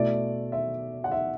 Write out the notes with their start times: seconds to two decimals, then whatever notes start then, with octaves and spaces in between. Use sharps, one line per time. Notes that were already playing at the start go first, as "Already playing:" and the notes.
Already playing: B2 A3 E4 D5
0.52 E5
1.04 F#5
1.12 E5